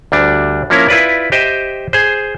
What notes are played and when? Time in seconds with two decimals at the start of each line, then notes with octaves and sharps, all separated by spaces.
0.12 D2 G3 D4
0.70 F3 A#3 C#4 E4 A#4
0.89 E4 F4 B4 D5
1.32 G4 C5 D#5 E5 G5
1.93 G#4 C5